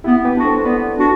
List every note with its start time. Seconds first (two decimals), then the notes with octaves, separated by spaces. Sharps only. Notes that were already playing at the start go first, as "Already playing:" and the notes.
0.04 B3 E4 G4
0.25 G4 B4
0.34 D4 F#4
0.45 A4 C5
0.65 B3 B4 D5
0.96 D4 F#4